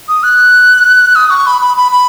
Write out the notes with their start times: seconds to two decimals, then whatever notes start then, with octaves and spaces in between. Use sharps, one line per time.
0.08 D#6
0.23 F#6
1.15 D#6
1.30 C#6
1.47 B5
1.61 B5
1.77 B5
1.92 B5